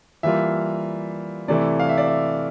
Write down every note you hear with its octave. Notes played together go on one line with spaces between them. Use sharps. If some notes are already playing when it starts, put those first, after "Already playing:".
E3 G3 A#3 F4 E5
C3 E3 A3 E4 D5
F5
E5
D5
E5